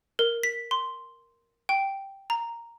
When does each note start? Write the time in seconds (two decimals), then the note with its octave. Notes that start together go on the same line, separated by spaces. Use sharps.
0.19 A#4
0.43 B6
0.71 C6
1.69 G5
2.30 A#5